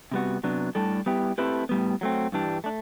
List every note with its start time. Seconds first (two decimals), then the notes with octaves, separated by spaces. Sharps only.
0.12 C3 G3 B3 F#4
0.43 C3 F#3 B3 D4
0.75 A2 G3 D4 A4
1.06 G3 B3 E4 G4
1.38 A3 C4 E4 G4 B4
1.69 A2 G3 B3
2.01 F#3 A3 C4
2.32 G2 E3 G3 D4
2.64 A3 D4